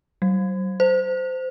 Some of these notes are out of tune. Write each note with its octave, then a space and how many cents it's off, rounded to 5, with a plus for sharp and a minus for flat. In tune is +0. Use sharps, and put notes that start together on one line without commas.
F#3 +40
C5 -20